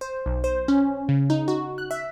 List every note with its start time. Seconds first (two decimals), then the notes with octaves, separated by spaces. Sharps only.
0.01 C5
0.26 B1
0.44 C5
0.68 C#4
1.09 C#3
1.30 D#4
1.48 F#4
1.78 F#6
1.91 E5